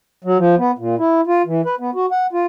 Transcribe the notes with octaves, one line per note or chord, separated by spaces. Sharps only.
F#3
F3
B3
A#2
E4
F4
E3
B4
B3
F#4
F#5
F4